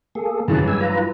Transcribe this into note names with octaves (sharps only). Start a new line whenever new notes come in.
A#3 G#4 A4
G2 C#3 E3 F#3 G#4 A5
G#3 G#5 E6
F4 B4 A#5